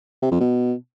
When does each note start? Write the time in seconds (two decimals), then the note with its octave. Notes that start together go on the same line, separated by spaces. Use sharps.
0.22 C3
0.31 F2
0.41 B2